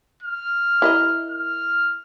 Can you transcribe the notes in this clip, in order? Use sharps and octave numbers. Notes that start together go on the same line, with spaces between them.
F6
E4 A#4 D#5
F6